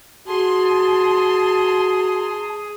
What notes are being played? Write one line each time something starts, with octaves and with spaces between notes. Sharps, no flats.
F#4 G#4 A5 C6